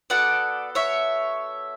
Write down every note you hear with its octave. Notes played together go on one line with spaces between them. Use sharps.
B3 F#4 A4 D5 F#5
C#5 E5